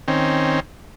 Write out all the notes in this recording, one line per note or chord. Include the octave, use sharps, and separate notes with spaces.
D#3 C4 C#4